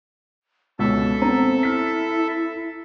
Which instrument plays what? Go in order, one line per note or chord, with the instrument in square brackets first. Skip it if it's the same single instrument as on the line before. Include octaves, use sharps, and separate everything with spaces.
[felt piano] C#2 B2 [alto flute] C#4 [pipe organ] A4 E5
[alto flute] B3 [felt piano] C4 [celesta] A#5
[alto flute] E4 [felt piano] F6 B6